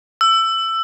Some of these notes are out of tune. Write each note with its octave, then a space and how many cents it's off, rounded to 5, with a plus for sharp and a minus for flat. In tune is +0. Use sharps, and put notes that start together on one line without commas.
E6 +15